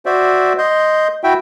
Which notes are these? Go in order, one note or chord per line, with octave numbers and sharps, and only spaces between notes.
F#4 C5 D5 E5
D#5 C6 G6
E4 F#4 E5 G5